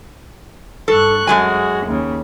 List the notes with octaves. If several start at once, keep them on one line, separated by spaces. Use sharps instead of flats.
G2 A4 C#6 F#6
F#2 G#3 F#4 G#4 G#5
D#2 C#3